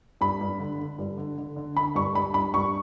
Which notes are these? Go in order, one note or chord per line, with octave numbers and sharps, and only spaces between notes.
G2 B5
G2
D3
D3
G2
D3
D3
D3
D3 B5
G2 C#6
G2 B5
G2 B5
G2 C#6